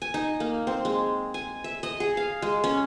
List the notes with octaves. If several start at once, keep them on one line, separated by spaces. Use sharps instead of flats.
G#5
D#4
A#3
C4
G#3
G#5
E5
D#5
G#4
F5
G#3
C#4